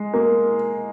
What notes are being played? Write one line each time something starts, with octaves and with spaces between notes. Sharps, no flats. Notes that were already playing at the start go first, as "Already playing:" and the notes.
Already playing: G#3
A#3